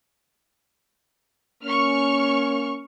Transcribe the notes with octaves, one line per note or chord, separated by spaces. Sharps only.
A#3 C#4 C#6 F6